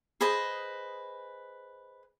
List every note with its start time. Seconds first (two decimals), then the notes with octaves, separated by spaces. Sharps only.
0.21 G#4 B4 C5 D#5